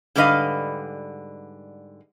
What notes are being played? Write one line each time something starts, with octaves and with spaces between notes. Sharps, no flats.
G#2 D3 G3 B4 D#5 F5